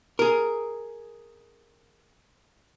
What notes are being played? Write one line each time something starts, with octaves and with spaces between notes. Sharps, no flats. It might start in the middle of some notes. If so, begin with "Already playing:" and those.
G#4 A#4